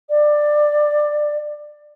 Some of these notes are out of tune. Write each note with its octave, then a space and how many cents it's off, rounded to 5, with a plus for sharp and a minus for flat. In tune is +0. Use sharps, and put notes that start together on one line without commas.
D5 +15